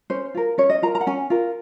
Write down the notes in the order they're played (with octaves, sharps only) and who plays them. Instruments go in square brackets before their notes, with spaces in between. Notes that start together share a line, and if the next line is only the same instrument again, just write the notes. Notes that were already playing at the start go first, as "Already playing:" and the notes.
[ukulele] C#4 C5
F4 A#4
C#4 C#5
D#5
F4 A#4 A#5
A#5
F#5
C#4 G#5
F4 A#4